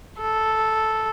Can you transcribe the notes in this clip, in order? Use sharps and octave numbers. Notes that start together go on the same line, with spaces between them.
A4